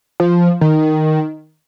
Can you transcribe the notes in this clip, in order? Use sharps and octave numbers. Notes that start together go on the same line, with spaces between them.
F3
D#3